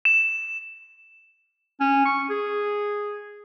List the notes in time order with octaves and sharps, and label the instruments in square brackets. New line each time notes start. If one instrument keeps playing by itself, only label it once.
[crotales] E7
[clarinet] C#4
C#6
G#4